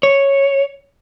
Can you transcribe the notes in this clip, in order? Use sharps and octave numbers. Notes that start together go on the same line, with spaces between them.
C#5